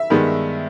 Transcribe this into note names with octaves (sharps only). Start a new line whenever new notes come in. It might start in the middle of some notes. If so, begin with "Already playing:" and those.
Already playing: E5
G2 D#3 G#3 B3